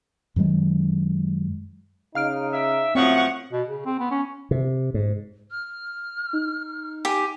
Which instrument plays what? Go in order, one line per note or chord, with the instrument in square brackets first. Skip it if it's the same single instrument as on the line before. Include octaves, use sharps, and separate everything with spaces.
[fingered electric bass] F#2 D#3 F#3 G#3
[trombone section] C#3 D#4 [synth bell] F5 F6 D7
[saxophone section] E5
[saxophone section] F#2 A2 F3 [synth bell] C4 E5 D#6 [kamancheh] F#5 C#6
[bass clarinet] B2
C#3
C4
B3
C#4
[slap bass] C3
G#2
[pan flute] F6
[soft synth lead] D#4
[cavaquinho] G4 [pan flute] G#5